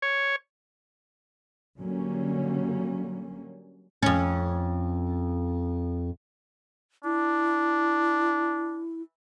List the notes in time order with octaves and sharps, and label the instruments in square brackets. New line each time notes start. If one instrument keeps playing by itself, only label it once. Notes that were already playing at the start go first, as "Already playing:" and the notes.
[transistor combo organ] C#5
[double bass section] D3 F#3 G3 A#3 C#4
[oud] F2 C#4
[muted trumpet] D4 [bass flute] E4